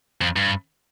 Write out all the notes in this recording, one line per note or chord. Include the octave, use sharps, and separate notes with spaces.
F2
G2